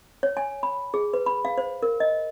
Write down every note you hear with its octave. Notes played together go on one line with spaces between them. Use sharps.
C#5
G#5
B5
G#4
B4
B5
F5
C5
A#4
D#5